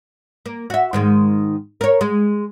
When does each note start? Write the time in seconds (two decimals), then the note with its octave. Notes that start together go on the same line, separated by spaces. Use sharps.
0.46 A#3
0.70 F#4 E5
0.93 G#2 D#3 G#3
1.81 A#4 C#5
2.01 G#3